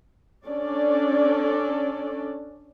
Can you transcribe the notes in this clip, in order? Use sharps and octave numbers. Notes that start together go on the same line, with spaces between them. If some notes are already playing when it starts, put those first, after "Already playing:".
C#4 D4 A4 D5